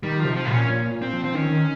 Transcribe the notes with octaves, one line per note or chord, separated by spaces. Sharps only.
D#3 G3
C3 F3
F3
A#2
C#4
A#2
A#2
C4
F3
C4
D#3 C#4
D#3